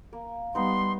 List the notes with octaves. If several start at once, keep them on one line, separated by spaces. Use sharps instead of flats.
A#3
G3 B3 D#4 C6